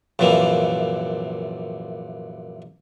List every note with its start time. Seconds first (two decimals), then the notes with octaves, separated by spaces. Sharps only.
0.19 A#1 F#2 C3 E3 A#3